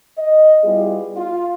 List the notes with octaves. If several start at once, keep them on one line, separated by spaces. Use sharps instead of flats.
D#5
G3 B3 E4 F4 G#4
F4